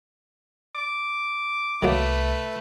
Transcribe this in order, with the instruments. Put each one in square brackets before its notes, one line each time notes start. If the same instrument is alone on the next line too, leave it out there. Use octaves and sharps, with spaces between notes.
[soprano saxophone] D6
[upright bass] C2 [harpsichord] D#3 F#3 A#3 [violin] A3 B4